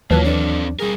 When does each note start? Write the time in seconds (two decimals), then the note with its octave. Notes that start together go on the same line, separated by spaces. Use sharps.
0.11 D#2 E3 F#3 A#3 F4 A5
0.24 C4 D4 A4
0.79 G3 G#4 A#4